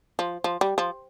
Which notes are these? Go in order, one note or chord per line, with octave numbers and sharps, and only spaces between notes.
F3
F3
G3
F3